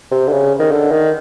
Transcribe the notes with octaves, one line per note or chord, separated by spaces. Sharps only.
C3
D3
C#3
D#3
D3
D#3